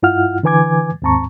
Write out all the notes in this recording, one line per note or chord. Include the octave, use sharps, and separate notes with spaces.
G2 E4 F4 F#5 F6
D3 E3 B4 G#5 D6 G#6
D#2 G#2 C4 A5 A#5 C#6